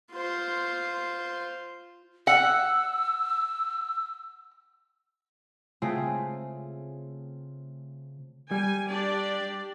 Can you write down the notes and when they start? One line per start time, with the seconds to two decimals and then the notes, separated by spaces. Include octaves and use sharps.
0.13 F4 C5
2.27 F#5 E6
5.82 C#3 A3 C4 F4 G#4
8.51 G3 G#5
8.86 D4 G4 D5